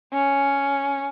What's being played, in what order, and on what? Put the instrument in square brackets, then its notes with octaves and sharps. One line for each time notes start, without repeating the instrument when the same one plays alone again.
[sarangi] C#4